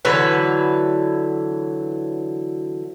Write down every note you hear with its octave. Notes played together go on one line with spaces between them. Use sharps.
D3 E3 F#3 B4